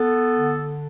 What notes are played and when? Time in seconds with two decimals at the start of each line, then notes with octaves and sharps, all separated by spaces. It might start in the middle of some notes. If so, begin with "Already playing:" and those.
Already playing: B3 A4
0.36 D3